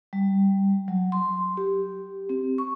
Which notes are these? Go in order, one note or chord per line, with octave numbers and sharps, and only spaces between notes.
G3
F#3
C6
G4
C4
C#6